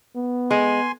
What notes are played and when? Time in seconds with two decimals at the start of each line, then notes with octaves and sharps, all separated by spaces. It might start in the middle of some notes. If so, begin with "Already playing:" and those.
0.16 B3
0.51 G#3 G#5 C6